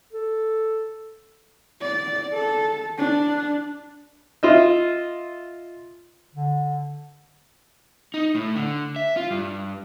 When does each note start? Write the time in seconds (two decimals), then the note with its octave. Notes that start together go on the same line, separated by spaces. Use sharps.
0.13 A4
1.82 D5
2.34 A4
2.98 D4
4.43 F4 D#5 E5
6.35 D3
8.14 D#4
8.35 A2
8.56 D3
8.96 E5
9.17 F4
9.31 G2